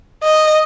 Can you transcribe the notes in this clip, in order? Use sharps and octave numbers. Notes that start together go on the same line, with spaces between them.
D#5